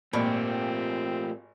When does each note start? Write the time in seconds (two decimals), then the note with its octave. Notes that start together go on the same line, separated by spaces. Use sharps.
0.13 G#1 A#2 A3 C4 G4 D5 B5